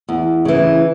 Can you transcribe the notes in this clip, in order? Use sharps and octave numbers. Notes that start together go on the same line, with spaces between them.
E2
C#3 E3